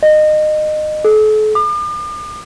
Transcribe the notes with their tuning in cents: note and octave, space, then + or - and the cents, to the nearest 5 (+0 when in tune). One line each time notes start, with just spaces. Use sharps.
D#5 -25
A4 -40
D6 +45